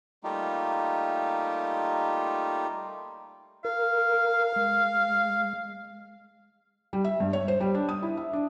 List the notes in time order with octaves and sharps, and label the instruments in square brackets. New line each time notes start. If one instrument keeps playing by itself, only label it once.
[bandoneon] G3 A3 A#3 D#4 F4 G4
[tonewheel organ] A#4 [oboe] F5
[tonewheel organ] G#3
[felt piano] G3
E5
G2
C#5
C5
G3
D4
D#6
E4
E5
D4